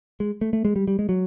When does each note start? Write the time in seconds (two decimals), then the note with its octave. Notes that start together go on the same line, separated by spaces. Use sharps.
0.20 G#3
0.41 A3
0.53 A3
0.65 G#3
0.76 G3
0.88 G3
0.99 G#3
1.09 F#3